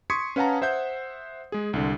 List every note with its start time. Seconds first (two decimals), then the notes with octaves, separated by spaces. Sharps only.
0.10 C6 C#6 D#6 G#6 B6 C#7
0.36 C#4 B4 F5 F#5 A5 A#5
0.62 C5 E5 F#5 G6
1.52 G#3 G#4
1.73 C2 D3